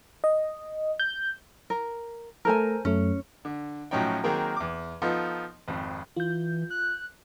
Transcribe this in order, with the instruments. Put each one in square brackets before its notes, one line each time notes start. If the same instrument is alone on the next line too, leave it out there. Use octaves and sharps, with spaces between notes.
[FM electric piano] D#5
G6
[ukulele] A#4
[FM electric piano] A3 A4 A#5 [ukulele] A#4 C5 G#5
[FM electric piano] F#2 A3 [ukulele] C#4
[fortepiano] D3
A2 F3 F#3 C#4 D#4 G5
D#3 F#3 A#3 C4 G#4 A#4
E2 D6
F3 B3 D#4 F4 A4
G#1 F2
[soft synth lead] E3 [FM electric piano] F4 G6
[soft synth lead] F#6